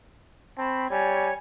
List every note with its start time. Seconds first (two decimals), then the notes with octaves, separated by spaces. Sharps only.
0.58 C4 A5 B5 C#6
0.90 G3 C#5 G#5